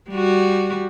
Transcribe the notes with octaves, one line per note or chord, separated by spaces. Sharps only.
G3 F#4